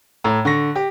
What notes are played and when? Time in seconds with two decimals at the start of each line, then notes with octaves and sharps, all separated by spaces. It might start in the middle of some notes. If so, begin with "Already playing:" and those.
0.24 A2 A#5
0.45 D3 C#6 A#6
0.76 G4